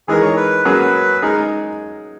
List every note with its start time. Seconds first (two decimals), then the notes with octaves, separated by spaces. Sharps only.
0.08 E3 G#3 D#4 G#4 A#4
0.22 C#5
0.37 B4
0.65 F#3 A#3 C#4 G#4 B4
1.22 G#3 D#4 G#4 A#4